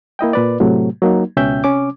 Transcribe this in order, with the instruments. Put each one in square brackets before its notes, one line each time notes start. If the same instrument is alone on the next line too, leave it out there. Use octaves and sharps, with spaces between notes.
[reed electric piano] A#3 E4 D#5 G5
A#2 B4 D5
A2 C3 F#3 A3
F#3 A#3 D#4
C#2 B2 C#4 E5 G5 G6
C3 C#4 D6